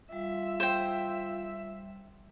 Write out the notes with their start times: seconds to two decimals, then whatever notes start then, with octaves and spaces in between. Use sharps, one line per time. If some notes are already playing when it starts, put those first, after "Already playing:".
0.12 G3 F4 E5
0.60 C5 G5